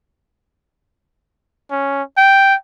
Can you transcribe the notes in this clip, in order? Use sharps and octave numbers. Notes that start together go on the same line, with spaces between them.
C#4
G5